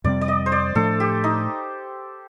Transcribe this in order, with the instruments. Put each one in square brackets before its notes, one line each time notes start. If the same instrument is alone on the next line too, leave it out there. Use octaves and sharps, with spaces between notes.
[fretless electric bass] F2 C3 G3 C4 [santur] D5
[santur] D5
D#5
C5
D5
[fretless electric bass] A2 F3 A3 D4 [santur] A4
[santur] G4
D#4